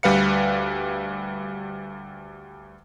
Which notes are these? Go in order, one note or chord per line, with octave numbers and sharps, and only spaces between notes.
D2 G3 B4 F5 C#7